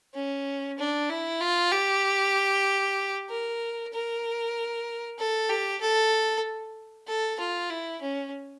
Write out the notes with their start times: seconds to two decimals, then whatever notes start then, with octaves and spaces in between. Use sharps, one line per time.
0.14 C#4
0.78 D4
1.09 E4
1.41 F4
1.72 G4
3.30 A#4
3.93 A#4
5.19 A4
5.50 G4
5.82 A4
7.07 A4
7.40 F4
7.70 E4
8.02 C#4